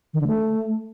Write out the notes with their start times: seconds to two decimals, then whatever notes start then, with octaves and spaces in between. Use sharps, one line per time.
0.14 D#3
0.20 D3
0.27 A3